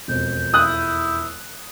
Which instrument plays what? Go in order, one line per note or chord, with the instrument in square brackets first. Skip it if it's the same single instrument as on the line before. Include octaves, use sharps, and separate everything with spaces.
[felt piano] E1 F2 [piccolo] G6
[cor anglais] E4 [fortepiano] D#6 F#6